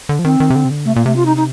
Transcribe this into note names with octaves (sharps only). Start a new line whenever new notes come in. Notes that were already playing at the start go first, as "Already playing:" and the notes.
D3
F3
D#3 C4
D#3
C3
D3
C3
D3
C3 A3
A#2 A#3
C3 A3
F4
D#4
D#4